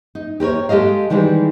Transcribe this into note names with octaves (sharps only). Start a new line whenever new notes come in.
D#4
G4 A#4 B4 C#5
G#3 G4 A4 D#5 F5
D#3 E3 G3 G#3